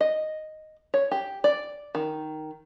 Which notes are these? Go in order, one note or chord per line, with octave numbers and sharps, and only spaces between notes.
D#5
C#5
G4
D5
D#3